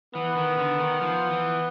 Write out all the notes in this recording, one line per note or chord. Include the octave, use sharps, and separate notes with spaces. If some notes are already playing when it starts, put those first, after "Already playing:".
E3 B3
D#3
D3
D#3
F3
E3